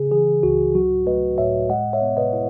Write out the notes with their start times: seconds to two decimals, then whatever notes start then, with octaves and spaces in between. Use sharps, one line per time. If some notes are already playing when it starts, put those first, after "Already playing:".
Already playing: C#3 G#4
0.11 E3 G#4
0.43 C#2 F#4
0.74 F#3 F#4
1.06 A3 B4 D#5
1.38 A2 C#5 E5
1.69 G#3 D#5 F#5
1.93 C#5 E5
2.02 B3
2.17 B4 D#5
2.33 E4